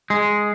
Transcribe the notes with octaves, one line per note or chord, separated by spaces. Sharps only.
G#3